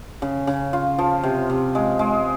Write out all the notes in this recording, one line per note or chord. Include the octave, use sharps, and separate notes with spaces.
C#3
C#3
F4
F3
C3
C3
G#3
G#3